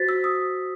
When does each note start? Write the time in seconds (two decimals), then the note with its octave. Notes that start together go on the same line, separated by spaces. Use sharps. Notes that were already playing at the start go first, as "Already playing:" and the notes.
Already playing: F#4 C5 A6 B6
0.09 E6
0.24 D#6